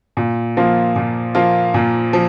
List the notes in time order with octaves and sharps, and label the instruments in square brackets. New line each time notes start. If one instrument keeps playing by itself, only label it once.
[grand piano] A#2
F3 A#3 F4
A#2
F3 A#3 F4
A#2
F3